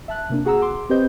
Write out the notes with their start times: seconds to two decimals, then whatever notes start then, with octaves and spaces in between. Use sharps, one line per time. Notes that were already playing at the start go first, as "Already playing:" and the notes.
0.08 E5 A5 F#6
0.30 C3 A#3 D4
0.45 F#4 G#4 F#5 A#5 E6
0.62 C6 D6
0.89 C4 G4 B4 C5 D#5 G6